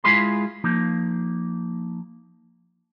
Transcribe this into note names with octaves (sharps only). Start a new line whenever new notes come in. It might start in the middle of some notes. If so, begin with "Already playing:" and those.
G#3 E4 F4 G#4 B5 C6
F3 A#3 D#4